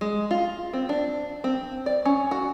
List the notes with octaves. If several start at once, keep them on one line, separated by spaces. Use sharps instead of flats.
G#3
F4
C4
D4
C4
D5
C#4
F#4